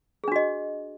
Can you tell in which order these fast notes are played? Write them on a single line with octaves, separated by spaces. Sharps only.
G#4 D4 F#4 D#5